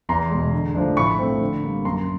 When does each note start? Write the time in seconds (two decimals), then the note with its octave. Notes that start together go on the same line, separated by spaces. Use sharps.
0.09 E2 A#5 C6
0.31 B2 G#3
0.53 D3
0.75 F3 A3 D4
0.96 A2 B5 C#6
1.19 F3 A3 C4
1.41 D3
1.63 G3 A#3
1.85 F#2 A#5 C6